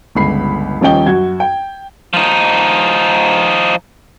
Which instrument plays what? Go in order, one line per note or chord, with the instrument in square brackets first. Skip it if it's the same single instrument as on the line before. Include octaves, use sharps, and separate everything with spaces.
[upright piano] G1 C#2 B5 C7
D#1 F3 C#4 D#5 G5 G7
F#2 F#4 G#6
G5
[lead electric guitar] F3 D#4